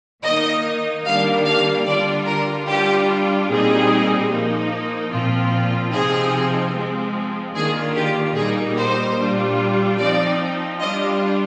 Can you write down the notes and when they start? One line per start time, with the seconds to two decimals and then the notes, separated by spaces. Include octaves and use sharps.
0.23 D#3 A#3 D#4 D#5
1.05 D#3 G3 A#3 D4 F5
1.45 F5
1.86 D3 G3 D4 F4 D5
2.26 A#4
2.67 G3 D4 F4 G4
3.49 A#2 G3 C4 D#4 G#4
4.30 F3 A#3 D#4
5.11 A#2 F3 C4 F4
5.92 C3 F3 C4 D#4 G#4
6.73 F3 G#3 C4
7.55 D#3 A#3 D4 F4 G#4
7.95 G4
8.36 A#2 G3 A#3 D#4 G#4
8.77 C5
9.17 A#2 G3 D4 F4
9.98 F3 C4 D#4 D5
10.80 G3 D4 F4 D#5